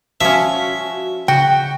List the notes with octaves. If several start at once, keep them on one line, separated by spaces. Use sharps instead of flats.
F3 C#4 F#4 E5
C#3 F#4 G5